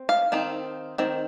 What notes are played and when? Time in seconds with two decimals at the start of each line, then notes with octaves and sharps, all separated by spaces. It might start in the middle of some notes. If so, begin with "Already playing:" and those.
Already playing: C4
0.09 F5
0.32 D#3 C4 D#4
0.98 D#3 C4